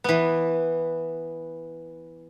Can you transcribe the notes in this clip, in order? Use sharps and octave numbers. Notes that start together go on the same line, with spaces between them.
E3 B3